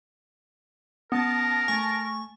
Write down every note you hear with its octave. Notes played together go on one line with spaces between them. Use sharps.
B3 C#4 A#4 A5 D#6
A3 G#5 C#6